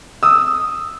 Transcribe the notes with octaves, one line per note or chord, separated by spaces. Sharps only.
D#6 E6